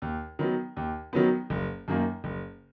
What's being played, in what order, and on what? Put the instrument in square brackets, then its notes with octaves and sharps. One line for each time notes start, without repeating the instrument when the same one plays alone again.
[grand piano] D#2
D#3 F#3 B3
D#2
D#3 F#3 B3
F#1
F#2 D#3 A#3
F#1